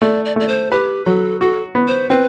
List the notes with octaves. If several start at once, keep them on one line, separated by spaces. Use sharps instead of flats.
A3 D5
D5
A3 D5
C5
G4 B4
F#3 A4
F#4 A4
B3
C5
C4 B4